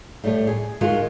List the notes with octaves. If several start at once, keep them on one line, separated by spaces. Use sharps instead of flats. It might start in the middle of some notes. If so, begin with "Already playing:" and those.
A2 G3 A3
G#4
D#3 G#3 F4 F#4